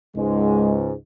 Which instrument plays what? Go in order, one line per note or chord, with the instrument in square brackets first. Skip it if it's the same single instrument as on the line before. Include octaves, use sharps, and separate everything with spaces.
[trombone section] C#2 G#2 [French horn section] G#3